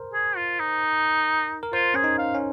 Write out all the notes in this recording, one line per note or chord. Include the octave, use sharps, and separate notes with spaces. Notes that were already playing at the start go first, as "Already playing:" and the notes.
Already playing: A#4 C5
G#4
F4
D#4
A#4
F4 C5
C#4 G#4
D#4
F5
C#4